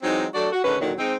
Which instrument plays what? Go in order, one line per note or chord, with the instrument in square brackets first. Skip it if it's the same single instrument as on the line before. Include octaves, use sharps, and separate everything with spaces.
[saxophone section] E3 F#3 G#3 C4 D#4
F#3 A3 D4 F#4 A4 D5
F#4
D3 D#3 G#3 C#4 B4
D#2 A#2 D3 D#3 F#3
G#3 C4 D#4